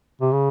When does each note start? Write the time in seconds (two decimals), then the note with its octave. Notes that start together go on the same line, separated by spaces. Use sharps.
0.21 C3
0.32 C#3